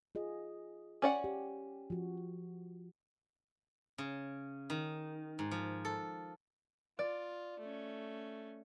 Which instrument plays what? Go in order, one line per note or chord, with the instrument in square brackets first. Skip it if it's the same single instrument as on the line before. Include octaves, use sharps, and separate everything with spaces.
[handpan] F4 G#4 D#5
[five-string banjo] C#4 D5 F#5
[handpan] G4
F3 F#4
[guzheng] C#3
D#3
G#2
F3
A4
[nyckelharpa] F4 [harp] D5
[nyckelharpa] A3 C#4